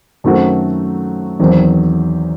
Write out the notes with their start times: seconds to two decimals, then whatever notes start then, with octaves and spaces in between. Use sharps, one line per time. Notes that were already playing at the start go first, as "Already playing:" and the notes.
0.24 F#2 D#3 A3 C4 F#4
1.40 E2 D#3 F#3 C4